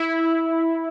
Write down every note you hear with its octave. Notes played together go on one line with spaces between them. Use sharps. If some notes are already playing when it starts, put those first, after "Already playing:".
Already playing: E4